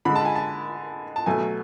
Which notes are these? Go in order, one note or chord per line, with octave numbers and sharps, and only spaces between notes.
D3 G#3 B5
A5
G#5
A5
A5
B2 F#3 A3 G#5